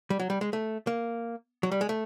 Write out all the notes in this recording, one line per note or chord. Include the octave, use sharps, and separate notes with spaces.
G3
F#3
G3
G#3
A3
A#3
F#3
G3
G#3
A3